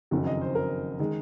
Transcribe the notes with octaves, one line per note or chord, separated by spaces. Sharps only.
F#1 F2 D#3 F#3
D#5
C5
A#4
D#3 G#3